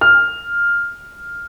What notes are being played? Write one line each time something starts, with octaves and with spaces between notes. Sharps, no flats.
F6